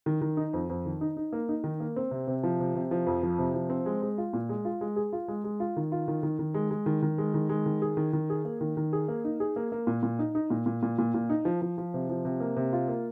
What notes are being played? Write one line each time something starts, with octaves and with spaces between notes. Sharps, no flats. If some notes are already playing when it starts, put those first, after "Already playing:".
D#3
D#3
D#4
F2
F2
D#3
D#4
D#4
A#3
D#4
D#3
A#3
C4
C3
C3
F3
C3
C3
F3
F2
F3
C3
F3
C4
G#3
G#3
F4
A#2
G#3
F4
G#3
G#4
F4
G#3
G#3
F4
D#3
F4
D#3
D#3
D#3
G#3
G#3
D#3
D#3
G#3
D#3
G#3
D#3
G#4
D#3
D#3
G#4
A#3
D#3
D#3
G#4
A#3
D#4
G#4
A#3
A#3
A#2
A#2
D#4
D#4
A#2
A#2
A#2
A#2
A#2
D#4
F3
F3
F3
C3
F3
C3
A#3
C3
F4
A#3